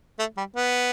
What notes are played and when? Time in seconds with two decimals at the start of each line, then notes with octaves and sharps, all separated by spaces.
0.19 A3
0.37 G3
0.56 B3